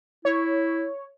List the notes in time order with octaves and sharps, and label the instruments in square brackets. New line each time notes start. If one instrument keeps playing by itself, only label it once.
[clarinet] E4 [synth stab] C#5